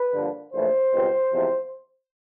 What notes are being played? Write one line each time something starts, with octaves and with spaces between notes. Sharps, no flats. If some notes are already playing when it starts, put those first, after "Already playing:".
Already playing: B4
G2 D3 F3 A#3
A#1 A2 E3 A3 C5
C#2 B2 G3 C4
E2 C3 F3 G#3